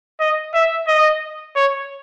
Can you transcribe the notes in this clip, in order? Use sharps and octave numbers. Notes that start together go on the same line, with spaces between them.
D#5
E5
D#5
C#5